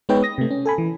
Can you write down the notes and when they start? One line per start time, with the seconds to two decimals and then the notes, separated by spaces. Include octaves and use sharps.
0.09 G#3 B3 D#4 B4 C#5 G5
0.23 D#6 A#6
0.38 C3 A3
0.51 C#4
0.66 A4 G#5 B5
0.78 E3